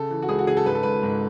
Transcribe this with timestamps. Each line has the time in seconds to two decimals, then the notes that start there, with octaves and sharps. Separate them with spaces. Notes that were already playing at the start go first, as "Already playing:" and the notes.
Already playing: C#3 A4
0.10 E3
0.22 F#4
0.29 C#2 G#4
0.39 F#4
0.47 C#3 G#4
0.57 A4
0.66 G#2 B4
0.75 A4
0.83 G#1 B4
1.03 G#2